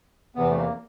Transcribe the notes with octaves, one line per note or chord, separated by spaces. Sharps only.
E2 C3 E3 B3
A3
A#3